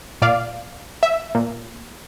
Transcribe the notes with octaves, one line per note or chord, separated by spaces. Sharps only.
A#2 D5 F5
E5
A#2